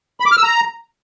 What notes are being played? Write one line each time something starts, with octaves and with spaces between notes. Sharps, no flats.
B5
D6
F6
E6
A#5